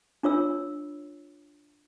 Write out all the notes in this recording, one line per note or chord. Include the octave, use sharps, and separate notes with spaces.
D4 F4 C#5 E6